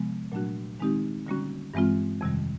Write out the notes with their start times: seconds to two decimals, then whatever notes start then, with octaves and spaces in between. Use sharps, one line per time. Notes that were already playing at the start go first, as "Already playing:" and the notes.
Already playing: C3 F3 G#3 B3
0.32 A#2 F#3 A3 D4 F#4
0.80 D#3 G#3 C4 D#4 G4
1.27 D3 G3 A#3 C#4 F#4
1.74 G2 E3 G#3 C4 F4
2.21 F2 C3 D#3 G3